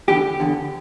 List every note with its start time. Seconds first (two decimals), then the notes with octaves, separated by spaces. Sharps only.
0.08 E2 D3 G4
0.40 E2 D3